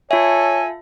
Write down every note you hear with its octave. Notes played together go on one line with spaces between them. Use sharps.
F4 A4 C#5 E5 G#5